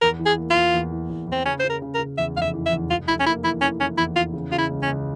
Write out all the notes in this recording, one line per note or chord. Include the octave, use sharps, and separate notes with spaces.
E2 A#4
E3
G#4
A#3
F4
E2
E2
E3
E2
E2 C4
C#3 C#4
C#3 C5
A#4
C#3
A#4
C#3
E2 E5
F1 F5
E5
E3
E5
E2
F1 F4
F1 E4
C#4
A#3 E4
E3 E4
E3 C#4
E3 C#4
E2 E4
E3 F4
C#3
C#3 F4
E4
C#2
C#4
C#2